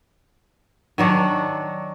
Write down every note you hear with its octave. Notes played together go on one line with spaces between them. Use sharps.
D#3 F#3 D4 F#5